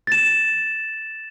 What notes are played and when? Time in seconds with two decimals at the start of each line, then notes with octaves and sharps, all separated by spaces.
0.07 A6 E7